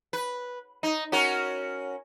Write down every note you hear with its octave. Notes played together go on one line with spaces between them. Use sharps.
B4
D#4
C#4 F#4 A#4